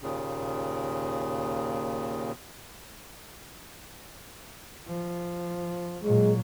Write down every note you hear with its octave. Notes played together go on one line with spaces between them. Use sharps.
D#2 A#2 C#3
F3
A#2 F#3 G#3